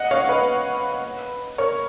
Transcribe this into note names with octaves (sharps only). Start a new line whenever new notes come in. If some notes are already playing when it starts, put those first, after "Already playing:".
Already playing: D#5 F#5
C#5 F5
B4 D#5
A#4 C#5